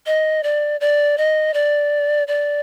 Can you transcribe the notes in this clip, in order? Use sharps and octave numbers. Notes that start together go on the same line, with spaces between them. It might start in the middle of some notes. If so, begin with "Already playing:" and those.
D#5
D5
D5
D#5
D5
D5